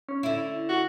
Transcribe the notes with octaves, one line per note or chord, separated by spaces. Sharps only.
C#4
D3 E4
F#4